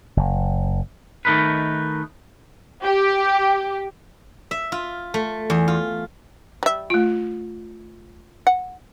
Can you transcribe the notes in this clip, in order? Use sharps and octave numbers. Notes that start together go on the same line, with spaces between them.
F#1
D#3 A3 D#4 A#4 B4
G4
E5
F4
A3
E2
F4
G3 E5
A3 F4
F#5